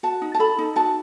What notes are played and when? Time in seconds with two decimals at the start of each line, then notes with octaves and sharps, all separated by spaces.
0.03 F#4 A5
0.22 D#4
0.34 A5
0.39 A4 B5
0.59 D#4
0.76 F#4 A5